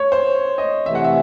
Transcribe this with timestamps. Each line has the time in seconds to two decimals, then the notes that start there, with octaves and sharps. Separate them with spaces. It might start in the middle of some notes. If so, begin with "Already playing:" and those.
Already playing: C#5
0.12 C5
0.58 D#5
0.86 C3 E3 A3 E5
0.95 F#5
1.04 E5